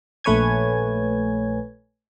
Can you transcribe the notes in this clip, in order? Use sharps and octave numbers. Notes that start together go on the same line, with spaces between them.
A#1 A3 B4 C#5 G#5 G#6